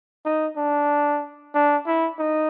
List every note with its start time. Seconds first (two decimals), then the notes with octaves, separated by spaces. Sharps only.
0.25 D#4
0.57 D4
1.54 D4
1.86 E4
2.19 D#4